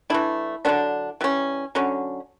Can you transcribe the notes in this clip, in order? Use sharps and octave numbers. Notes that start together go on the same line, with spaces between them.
E3 A3 D4 E4
D3 F#3 B3 D4
E3 G3 C#4
D3 F#3 C#4